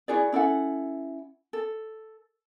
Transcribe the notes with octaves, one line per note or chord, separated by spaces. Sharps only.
E4 F#4 G#4 D5
C#4 E4 A4 F#5
A4